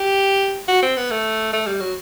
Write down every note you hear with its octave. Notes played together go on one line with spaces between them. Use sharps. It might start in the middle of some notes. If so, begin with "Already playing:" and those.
Already playing: G4
F#4
C4
B3
A3
A3
G3
F#3